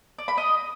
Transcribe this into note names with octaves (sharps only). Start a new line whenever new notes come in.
D5
B5
D#5